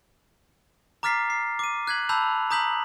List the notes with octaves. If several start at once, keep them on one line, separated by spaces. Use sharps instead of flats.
A#5 D6 F6 A6 B6 C7
C7
D6 D#7
F#6 G#6 B6 F#7
A5 B5 E6 G6 F7
A#5 D#6 G6 B6 F#7